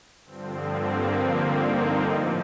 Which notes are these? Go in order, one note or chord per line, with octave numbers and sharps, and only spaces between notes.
G2 D3 F3 C4
A#3
C4
D#4
A2 F3